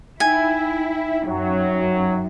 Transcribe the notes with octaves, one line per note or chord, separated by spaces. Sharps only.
D#4 E4 E5 G5 G#5
F#2 F#3